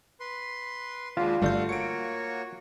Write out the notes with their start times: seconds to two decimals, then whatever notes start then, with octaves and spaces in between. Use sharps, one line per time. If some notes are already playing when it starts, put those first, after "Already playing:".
0.20 B4 C6
1.17 D#2 G#3 D4 F4 F#4 B4
1.42 G1 D3 G3 A3 F#4 F5 G6
1.69 A#3 F#4 C#5 C#7 D7